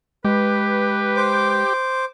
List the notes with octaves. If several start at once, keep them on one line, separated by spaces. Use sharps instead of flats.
G#3 G4 B4
C5 D6